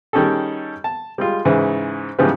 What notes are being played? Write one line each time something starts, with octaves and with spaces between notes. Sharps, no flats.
D#3 G3 C#4 G#4 A4
A5
G3 G#3 F4
G#2 C#3 E3 E4
G#2 C#3 E3 F3 G3 B3